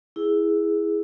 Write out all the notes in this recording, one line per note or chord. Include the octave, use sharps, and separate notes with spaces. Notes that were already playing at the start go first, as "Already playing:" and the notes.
E4 G#4